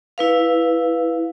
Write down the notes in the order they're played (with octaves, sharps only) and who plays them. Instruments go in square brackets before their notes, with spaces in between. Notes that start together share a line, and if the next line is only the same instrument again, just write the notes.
[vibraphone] E4 B4 F5